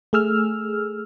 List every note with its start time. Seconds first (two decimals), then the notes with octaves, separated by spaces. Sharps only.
0.13 A3 G#4 E6 F6